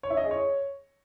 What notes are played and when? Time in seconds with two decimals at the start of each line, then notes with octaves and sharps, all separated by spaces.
0.03 C#5
0.10 E4
0.17 D#5
0.24 G#4
0.31 C#5